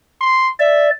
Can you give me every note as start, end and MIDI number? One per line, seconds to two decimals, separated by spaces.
0.21 0.50 84
0.60 0.90 74
0.60 0.89 76